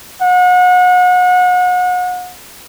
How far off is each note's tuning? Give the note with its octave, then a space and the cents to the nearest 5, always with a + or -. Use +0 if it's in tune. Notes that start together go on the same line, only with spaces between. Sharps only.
F#5 -35